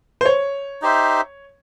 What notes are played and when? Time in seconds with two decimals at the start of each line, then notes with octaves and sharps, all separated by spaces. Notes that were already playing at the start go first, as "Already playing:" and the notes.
0.21 C5
0.26 C#5
0.82 D#4 G4 C5 E5